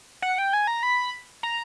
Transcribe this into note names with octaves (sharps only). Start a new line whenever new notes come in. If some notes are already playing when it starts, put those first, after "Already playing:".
F#5
G5
G#5
A#5
B5
A#5